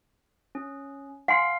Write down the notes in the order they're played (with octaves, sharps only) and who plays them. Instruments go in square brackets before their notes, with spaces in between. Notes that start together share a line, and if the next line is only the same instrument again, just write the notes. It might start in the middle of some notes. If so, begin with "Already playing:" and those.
[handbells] C#4
[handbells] F5 [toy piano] F#5 G#5 C6